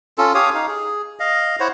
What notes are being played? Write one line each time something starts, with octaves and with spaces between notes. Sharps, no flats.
C#4 F4 A4
G4 C#5 F5 D#6
D#4 F5
G#4
D#5 F5
E4 C5 C#5 F#5